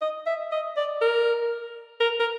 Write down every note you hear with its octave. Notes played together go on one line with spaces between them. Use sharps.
D#5
E5
D#5
D5
A#4
A#4
A#4